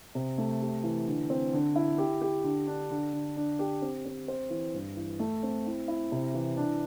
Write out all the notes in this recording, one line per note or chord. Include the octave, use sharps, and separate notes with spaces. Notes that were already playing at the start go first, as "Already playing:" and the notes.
C3
A3
G4
E3
D3
C4
D3
E4
G4
G4
D3
D4
D3
D3
D4
G4
C4
C4
C5
E3
G2
E3
A3
C4
E4
E4
C3
E3
D4